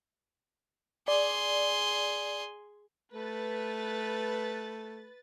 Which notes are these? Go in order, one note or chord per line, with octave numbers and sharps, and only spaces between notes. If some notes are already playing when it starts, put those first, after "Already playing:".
G#4 D5 C6
A3 B4 A6